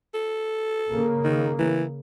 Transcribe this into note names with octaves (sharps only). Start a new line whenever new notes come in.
A4
C#3 A#3
D#3
E3